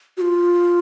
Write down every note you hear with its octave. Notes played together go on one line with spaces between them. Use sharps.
F#4
F4